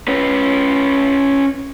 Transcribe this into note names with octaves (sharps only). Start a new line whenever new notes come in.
C#4 B4